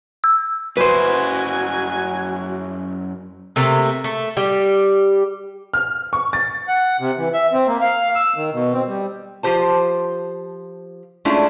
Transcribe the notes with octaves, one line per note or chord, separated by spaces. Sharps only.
E6
F#2 E4 F#4 B4 C5 G#5
C3 A3 A#3
A3
G3 G4
F6
C#6
A6
F#5
C3
E3
E5
C4
A#3
F5
E6
D#3
B2
C4
G3
F3 F4 G4 C5 A5
G#3 A3 C#4 D4 E4 F4